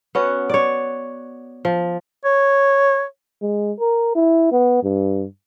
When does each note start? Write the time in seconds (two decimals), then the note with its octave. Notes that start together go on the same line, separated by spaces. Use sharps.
0.15 B3 C#4 F#4
0.50 C#5 D5
1.65 F3
2.25 C#5
3.42 G#3
3.80 A#4
4.15 E4
4.52 B3
4.83 G2